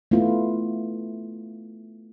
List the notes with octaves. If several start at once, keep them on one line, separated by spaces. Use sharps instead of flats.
A3 B3 E4 F4